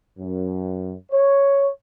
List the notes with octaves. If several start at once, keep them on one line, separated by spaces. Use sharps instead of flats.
F#2
C#5